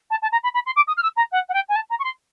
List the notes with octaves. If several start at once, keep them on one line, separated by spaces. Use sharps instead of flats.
A5
A5
A#5
B5
B5
C6
D6
D#6
F6
E6
A#5
F#5
F#5
G5
G#5
A5
A#5
C#6
C6